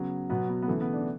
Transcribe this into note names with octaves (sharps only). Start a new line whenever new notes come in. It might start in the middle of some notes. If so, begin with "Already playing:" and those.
Already playing: C#3 F#3 B3
B2 F#3 B3
B3
B3
C#3 E3 A3
B3
D4